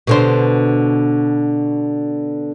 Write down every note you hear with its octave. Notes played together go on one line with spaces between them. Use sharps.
B2 D3 C5